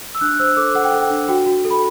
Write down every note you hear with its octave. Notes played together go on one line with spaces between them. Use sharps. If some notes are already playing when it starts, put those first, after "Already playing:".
E6
D4 F#6
C5 E6
A4 D6
A4 F#5
G5
A4 F#5
G5
D4
F#4 G5
F#4
A4
B5